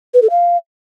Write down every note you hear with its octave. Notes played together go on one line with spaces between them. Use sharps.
B4
A4
F5